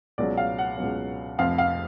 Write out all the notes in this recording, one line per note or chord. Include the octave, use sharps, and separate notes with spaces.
C#2 B2 F#3 D5
F5
F#5
C#2 B2 F#3
F1 F2 F3 F5
F5